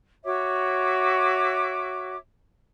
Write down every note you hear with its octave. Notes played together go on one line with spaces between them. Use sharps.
F#4 C#5 E5 D6